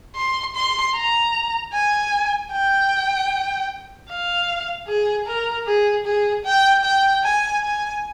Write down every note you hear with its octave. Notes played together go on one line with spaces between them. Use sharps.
C6
C6
A#5
G#5
G5
F5
G#4
A#4
G#4
G#4
G5
G5
G#5
G#5